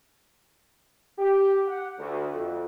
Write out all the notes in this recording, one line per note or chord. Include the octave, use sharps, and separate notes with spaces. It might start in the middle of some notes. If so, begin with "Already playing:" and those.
G4
F#5
D2
F2